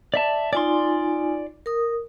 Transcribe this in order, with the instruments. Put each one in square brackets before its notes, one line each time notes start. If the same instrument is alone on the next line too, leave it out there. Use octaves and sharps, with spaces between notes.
[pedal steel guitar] D5 E5 A5
[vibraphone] D#4 F4 G#5 [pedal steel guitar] D5 C6
[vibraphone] A#4 D#6